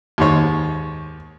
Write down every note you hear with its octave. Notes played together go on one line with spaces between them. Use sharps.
D#2 G#2 C#5